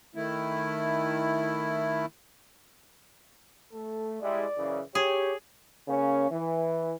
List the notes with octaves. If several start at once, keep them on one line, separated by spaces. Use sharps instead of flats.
D#3 A3 E4
A3 A4
G3 G#3 E4 D5
F#2 C#3 E3
G4 G#4 C#5
C#3 A#3 C#4
E3